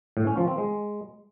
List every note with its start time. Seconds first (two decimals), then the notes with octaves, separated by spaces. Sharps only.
0.17 A2
0.27 C#4
0.37 F3
0.48 C4
0.58 G#3